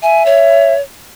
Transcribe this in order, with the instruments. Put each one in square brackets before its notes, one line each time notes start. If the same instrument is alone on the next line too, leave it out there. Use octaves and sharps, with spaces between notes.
[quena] E5 [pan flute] G#5
[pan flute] C#5